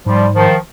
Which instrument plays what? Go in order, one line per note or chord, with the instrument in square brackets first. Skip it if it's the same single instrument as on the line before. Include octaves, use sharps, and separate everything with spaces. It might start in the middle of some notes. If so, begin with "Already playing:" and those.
[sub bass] G#2 [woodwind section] F3 G3
[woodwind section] D#3 F3